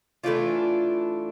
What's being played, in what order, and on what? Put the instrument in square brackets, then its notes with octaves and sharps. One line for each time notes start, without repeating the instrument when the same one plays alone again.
[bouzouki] E3 A3 D4 F4